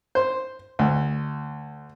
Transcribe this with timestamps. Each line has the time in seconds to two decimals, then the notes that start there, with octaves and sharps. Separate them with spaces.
0.15 C5
0.79 D2